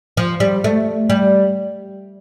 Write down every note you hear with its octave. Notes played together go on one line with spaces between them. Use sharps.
F3
G3
A3
G3